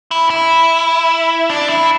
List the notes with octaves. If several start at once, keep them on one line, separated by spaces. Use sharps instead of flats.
E4
E4
D4
E4